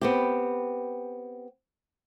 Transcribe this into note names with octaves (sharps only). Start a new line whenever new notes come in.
B3 C4 G4